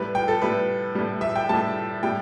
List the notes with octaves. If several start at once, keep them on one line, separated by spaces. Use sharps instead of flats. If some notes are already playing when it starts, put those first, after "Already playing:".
Already playing: A2 G3 B4
G5
A4
A2 G3 B4
A2 G3
E5
G5
A2 G3 A5
A2 G3 G5